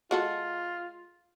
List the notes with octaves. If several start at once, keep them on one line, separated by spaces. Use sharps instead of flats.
G#3 F4 F#4 A4